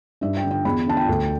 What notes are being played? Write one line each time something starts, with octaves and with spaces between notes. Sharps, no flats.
G2 E5
G5
D3
G5
E2 B5
D3 A5
G5
D2